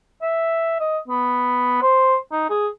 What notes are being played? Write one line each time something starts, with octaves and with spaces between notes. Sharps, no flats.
E5
D#5
B3
C5
D#4
G#4